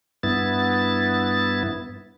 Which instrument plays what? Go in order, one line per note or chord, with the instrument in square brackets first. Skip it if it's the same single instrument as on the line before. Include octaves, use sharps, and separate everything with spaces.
[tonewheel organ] G2 B3 E4 A6